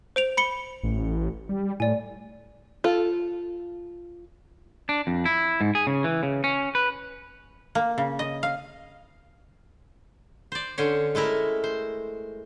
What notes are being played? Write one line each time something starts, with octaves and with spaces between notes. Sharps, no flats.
C5 D7 F7
B5 C#7 G7
A1
G3
A2 D5 G#5
F4 A4
D4
F2
E4
G#2
G#4
C#3
E3
C#3
C#4
B4
A#3
C#3
D#5
F5
C5 D5
D3 C#4 C5 C#5
G#3 A3 E4 A#4
C5